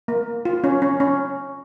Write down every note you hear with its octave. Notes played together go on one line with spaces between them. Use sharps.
A#3
F4
C#4
C#4
C#4